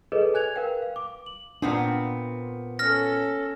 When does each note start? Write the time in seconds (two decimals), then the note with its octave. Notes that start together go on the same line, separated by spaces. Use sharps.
0.12 G#4 A4 B4 C#5 D#5
0.34 G#5 F#6 G#6 F7
0.56 A#4 B4 F5 G5
0.82 F5
0.96 D6
1.26 F#7
1.62 A#2 B3 C4 D4
2.79 C#4 A4 F6 A#6